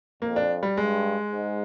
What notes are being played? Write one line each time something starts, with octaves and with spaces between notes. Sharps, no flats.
F2 A#3
D4
G3
G2 G#3
G#2